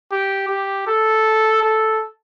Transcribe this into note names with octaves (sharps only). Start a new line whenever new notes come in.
G4
G4
A4
A4